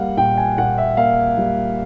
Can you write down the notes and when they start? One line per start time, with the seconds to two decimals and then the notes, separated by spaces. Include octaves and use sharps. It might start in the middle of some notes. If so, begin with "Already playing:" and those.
Already playing: G3 A#3 F5 F#5
0.17 A#2 G5
0.37 G#5
0.58 A#2 F#5
0.78 E5
0.97 A#3 F5
1.38 G3